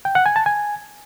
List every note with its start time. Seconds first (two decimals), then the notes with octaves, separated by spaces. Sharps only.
0.05 G5
0.15 F#5
0.26 G#5
0.36 A5
0.46 G#5